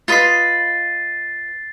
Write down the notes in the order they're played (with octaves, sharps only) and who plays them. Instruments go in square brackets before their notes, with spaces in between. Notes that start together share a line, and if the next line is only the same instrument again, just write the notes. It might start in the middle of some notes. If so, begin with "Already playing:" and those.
[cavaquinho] F4 B4 D#5 [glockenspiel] A6 C7